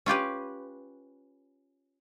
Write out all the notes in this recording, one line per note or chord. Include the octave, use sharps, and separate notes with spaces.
C#4 F4 G4 B4